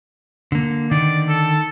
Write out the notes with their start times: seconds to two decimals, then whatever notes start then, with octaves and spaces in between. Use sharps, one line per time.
0.52 D3 A#3
0.91 D3 D#3 D#4 D5
1.29 A4